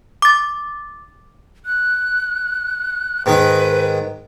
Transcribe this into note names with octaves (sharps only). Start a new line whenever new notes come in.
D6 A6
F#6
G#2 D#3 D#4 B4